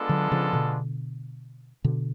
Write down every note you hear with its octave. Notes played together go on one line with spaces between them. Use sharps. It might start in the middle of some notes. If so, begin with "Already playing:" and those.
Already playing: G#3 B3 D4 F4 A4
D3 F#3
C#3 F3
B2 D3
B2 D3